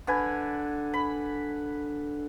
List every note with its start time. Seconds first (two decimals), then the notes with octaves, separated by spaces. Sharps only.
0.07 D3 B4 G#5
0.94 B5